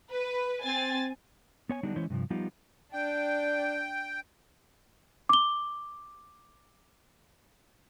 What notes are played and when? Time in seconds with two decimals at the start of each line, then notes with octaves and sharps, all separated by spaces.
0.12 B4
0.63 C4 G#5 A6
1.69 B3 C#5 G#5
1.83 D3 F#3 G3 B3 D4 D#4
1.96 E3 G#3 C#4 E4 C5 C#5
2.10 G2 C3 F3
2.30 F3 G3 B3 D#4 F4 G4
2.93 D4 G5
5.29 D6 G7